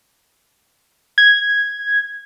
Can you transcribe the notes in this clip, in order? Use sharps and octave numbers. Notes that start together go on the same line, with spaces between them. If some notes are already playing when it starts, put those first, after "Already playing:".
G#6